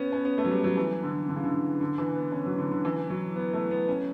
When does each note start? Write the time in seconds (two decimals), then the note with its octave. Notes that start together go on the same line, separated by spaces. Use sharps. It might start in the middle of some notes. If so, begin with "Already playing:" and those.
Already playing: B3 C#4
0.12 C#4
0.25 B3
0.38 A3
0.45 F#3
0.51 G3
0.64 F#3
0.77 E3
1.03 D3
1.29 D3
1.36 C#3
1.43 D3
1.54 C#3
1.81 D3
1.98 E3
2.15 B3
2.32 C#4
2.46 F#3
2.58 D3
2.72 D3
2.85 E3
3.10 F#3
3.36 B3
3.53 A3
3.71 B3
3.88 C#4